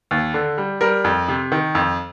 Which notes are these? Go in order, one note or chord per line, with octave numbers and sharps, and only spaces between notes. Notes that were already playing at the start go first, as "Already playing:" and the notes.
D#2
D3
G3
G3 A#4
F2
C3
D#3
F2